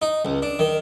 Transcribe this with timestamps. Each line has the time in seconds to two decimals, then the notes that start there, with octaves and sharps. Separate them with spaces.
0.02 D#4
0.25 C#2
0.42 D4
0.59 D#3